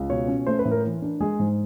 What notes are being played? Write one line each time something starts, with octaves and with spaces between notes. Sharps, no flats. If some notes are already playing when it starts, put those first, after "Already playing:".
Already playing: C#2
B2 C#5
C#4
A3 C5
B4
A2
A#4
E3
D4
G#3 G#4
G#2